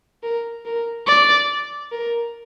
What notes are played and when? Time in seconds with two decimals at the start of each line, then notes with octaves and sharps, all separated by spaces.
0.23 A#4
0.66 A#4
1.07 D5
1.92 A#4